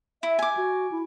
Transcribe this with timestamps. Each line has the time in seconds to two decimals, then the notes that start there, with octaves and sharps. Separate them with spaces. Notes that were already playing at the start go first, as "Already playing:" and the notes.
0.23 E4 E5
0.39 G#5 D6
0.57 F#4
0.91 E4